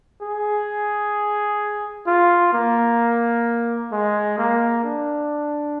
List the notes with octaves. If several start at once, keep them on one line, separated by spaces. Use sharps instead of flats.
G#4
F4
A#3
G#3
A#3
D4